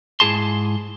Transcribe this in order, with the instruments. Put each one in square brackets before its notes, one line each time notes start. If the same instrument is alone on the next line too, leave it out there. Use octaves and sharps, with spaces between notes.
[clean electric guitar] G#2 E4 G#4 A5 C6